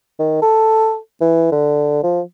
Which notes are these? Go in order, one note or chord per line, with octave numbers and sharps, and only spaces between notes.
D#3
A4
E3
D3
F3